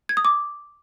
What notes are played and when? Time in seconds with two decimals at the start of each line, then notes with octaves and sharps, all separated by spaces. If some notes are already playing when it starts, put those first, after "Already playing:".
0.09 G#6
0.17 D#6
0.25 D6